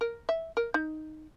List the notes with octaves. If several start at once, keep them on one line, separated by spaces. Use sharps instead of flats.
A#4
E5
A#4
D#4